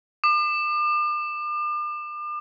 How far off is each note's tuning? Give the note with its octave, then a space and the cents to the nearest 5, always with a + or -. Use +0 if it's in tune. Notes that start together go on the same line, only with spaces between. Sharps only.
D6 +40